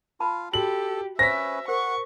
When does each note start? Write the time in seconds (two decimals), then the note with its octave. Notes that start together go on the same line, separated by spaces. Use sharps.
0.20 F4 A5 B5
0.53 F#4 G4 A4 F#7
1.19 C#4 B4 C5 E5 A#6 B6
1.68 A#4 C5 F#5 C#6